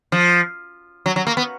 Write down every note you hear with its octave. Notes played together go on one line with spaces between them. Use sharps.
F3
F#3
F#3
A#3
B3